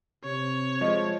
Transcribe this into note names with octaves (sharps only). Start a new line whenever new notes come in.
C3 C#5
F3 G#3 D#5 E5